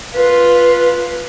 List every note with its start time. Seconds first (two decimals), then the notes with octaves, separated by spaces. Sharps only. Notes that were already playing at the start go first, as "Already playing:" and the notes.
0.14 F4 B4